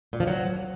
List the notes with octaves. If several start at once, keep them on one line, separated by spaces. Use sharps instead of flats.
A#2
F3
F#3